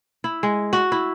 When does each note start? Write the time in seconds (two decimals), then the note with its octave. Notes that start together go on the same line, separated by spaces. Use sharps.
0.24 E4
0.43 G#3
0.73 F#4
0.92 E4